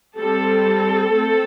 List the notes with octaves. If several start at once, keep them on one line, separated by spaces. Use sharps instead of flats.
G3 C4 A4
A3 C4